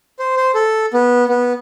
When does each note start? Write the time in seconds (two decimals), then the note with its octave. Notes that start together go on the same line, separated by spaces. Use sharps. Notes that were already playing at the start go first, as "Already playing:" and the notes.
0.19 C5
0.37 C5
0.55 A4
0.94 B3
1.29 B3